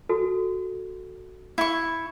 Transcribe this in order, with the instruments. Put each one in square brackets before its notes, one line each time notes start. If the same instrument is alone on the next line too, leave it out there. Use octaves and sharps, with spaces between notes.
[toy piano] F#4 A4
[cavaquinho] E4 C#6